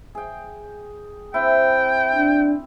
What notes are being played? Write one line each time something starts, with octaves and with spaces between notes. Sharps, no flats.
G#4 G5
C4 E4 G5
D4